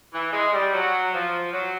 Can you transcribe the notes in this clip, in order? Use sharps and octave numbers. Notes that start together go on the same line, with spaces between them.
E3
G#3
G3
F#3
F3
F#3